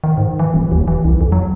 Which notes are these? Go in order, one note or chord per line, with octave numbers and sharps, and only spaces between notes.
D#3
G#2
E3
D#1
D#2
E3
C2
F2
F#3